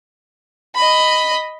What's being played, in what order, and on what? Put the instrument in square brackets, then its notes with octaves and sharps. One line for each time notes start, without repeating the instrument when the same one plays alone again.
[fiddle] D#5 B5